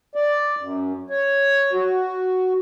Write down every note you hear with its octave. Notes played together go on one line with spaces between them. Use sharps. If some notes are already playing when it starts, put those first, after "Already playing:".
D5
F#2
C#5
F#4